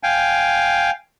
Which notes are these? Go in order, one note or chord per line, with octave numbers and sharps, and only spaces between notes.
F5 G5 G#5